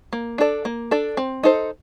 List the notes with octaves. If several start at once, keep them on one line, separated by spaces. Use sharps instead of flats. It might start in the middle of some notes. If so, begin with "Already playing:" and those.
A#3
D4 A4 D5
A#3
D4 A4 D5
C4
D#4 A4 C5